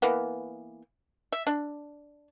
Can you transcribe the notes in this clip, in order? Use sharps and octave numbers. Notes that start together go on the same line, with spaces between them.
E3 A#3 B3
E5
D4